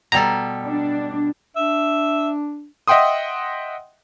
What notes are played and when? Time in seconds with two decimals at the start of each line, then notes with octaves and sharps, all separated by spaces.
0.12 B2 G3 A4 A#5
0.65 D4
1.56 D4 E5
2.88 D#5 E5 F#5 G5 C6 D#6